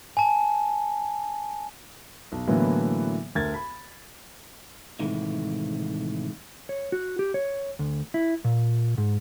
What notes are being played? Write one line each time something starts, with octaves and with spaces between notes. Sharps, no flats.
G#5 A5
B1
A2 D3 E3 F#3 A#3 B3
D2 A#4 G#6 A6
B5
A2 C3 D#3 E3 G#3 A3
C#5
F#4
G4
C#5
D2
E4
A#2
G#2